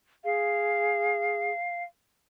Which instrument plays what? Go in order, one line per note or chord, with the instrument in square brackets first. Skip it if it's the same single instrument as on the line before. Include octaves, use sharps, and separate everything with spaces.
[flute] G#4 [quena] F5